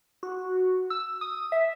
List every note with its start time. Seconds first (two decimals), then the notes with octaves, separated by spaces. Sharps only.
0.23 F#4
0.90 E6
1.21 D#6
1.52 E5